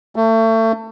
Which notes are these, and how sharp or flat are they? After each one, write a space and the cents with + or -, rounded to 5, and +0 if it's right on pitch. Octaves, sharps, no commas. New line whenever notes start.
A3 +30